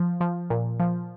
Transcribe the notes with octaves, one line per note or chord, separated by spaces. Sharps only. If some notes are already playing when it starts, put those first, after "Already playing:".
Already playing: F3
F3
A#2
F3